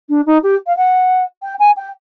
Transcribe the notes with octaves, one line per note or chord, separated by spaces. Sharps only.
D4
D#4
G4
F5
F#5
G5
G#5
G5